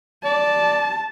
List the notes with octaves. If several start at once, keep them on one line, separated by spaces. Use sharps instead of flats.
D5 A5